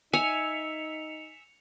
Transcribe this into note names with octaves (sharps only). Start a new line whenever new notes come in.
D#4 E5 G#5 C#7 F7